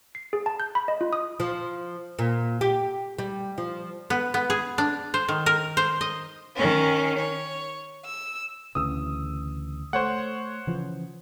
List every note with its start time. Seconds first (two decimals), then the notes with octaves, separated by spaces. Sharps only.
0.15 C7
0.33 G#4
0.46 A5
0.60 G6
0.75 B5
0.88 D#5
1.01 F4
1.13 D#6
1.40 F3
2.19 A#2
2.61 G4
3.19 G3
3.58 F3
4.10 B3
4.34 B3
4.50 G#4
4.78 D4
5.14 C5
5.28 D#3
5.46 A#4
5.77 C5
6.01 D#5
6.56 D#3 C#4
7.17 C#5
8.04 E6
8.75 D2 C#3 E3 D#6 E6
9.93 A3 C5 C#5 F#5
10.67 C#3 E3 F3